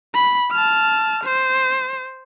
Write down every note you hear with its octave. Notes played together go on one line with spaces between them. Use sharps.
B5
A5 F6
C5